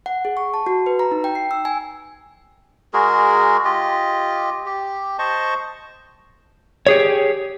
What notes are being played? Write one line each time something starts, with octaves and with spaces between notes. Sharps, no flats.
F#5
G#4
C#6
A5
F#4
B4
A#5
D#4
G5
C7
E6
G#5
G#3 F#4 G#4 A#4
F4 G4 D#5
G4
C5 D#5 A5 C#6
G4 G#4 C#5